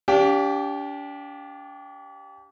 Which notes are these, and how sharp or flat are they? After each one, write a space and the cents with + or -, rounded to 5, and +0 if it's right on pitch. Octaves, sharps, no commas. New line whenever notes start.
D4 -40 G4 +0 F5 +25